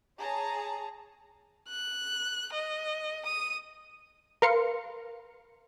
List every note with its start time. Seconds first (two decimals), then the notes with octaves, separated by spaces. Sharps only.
0.20 G#4 C#5 A5 A#5
1.69 F#6
2.53 D#5
3.26 D#6 D#7
4.42 A#4 B4 F5 C6 C#7